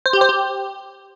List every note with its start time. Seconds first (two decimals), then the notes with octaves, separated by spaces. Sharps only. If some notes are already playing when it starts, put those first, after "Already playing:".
0.06 C5
0.13 G4
0.21 C5
0.29 G4